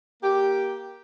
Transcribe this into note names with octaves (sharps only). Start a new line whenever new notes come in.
A#3 G4